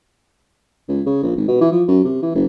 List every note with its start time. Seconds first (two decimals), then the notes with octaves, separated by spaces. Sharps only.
0.88 C#2
1.06 C#3
1.23 A#1
1.36 G#1
1.48 B2
1.61 E3
1.72 F3
1.88 F#2
2.04 C3
2.23 E3
2.35 F#1